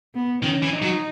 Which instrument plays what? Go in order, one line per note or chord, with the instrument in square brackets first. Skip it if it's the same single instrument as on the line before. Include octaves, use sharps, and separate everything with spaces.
[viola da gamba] B3
[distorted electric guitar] D#3 [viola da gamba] C#4
[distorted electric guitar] E3
[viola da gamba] D#4
[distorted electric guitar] F#3